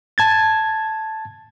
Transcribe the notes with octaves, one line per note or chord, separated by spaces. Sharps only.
A5 G#6 A6